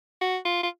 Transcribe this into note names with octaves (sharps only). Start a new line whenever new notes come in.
F#4
F4
F4